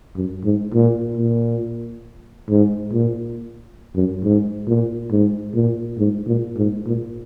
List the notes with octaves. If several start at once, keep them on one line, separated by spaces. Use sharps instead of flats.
F#2
G#2
A#2
A#2
G#2
A#2
F#2
G#2
A#2
G#2
A#2
G#2
A#2
G#2
A#2